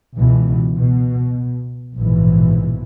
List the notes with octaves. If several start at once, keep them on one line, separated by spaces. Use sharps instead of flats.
C#2 B2 E3
B2
A#1 G#2 B2 E3